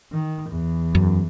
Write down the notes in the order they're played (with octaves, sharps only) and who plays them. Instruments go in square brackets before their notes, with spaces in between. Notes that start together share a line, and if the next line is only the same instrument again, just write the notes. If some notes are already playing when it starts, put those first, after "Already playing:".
[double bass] D#3
E2
[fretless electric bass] F#2